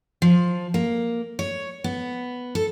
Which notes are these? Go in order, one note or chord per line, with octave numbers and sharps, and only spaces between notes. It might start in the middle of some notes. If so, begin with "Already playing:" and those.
F3
A#3
C#5
B3
A4